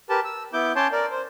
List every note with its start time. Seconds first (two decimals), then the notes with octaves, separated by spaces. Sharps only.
0.10 G4 A#4 B4 A5
0.25 E6
0.53 B3 E4 D6 G6
0.76 C#4 C#5 A5 C6 D6 G6
0.92 A#4 D5
1.11 C5